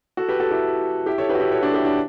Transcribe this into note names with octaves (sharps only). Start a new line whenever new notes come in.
F#4 A4
G4 B4
F#4 A4
E4 G4
E4 G4
A4 C#5
G4 B4
F#4
E4 G4
A4 C#5
D4 F#4
E4 G4
D4 F#4